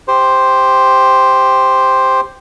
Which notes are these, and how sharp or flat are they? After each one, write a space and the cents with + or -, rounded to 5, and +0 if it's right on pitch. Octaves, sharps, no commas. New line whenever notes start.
G4 +0 C5 +0